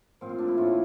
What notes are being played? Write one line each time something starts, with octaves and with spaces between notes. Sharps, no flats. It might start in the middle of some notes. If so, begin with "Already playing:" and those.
A#2 F3 C4
F4
D4
E4
A2 E3 A3 F4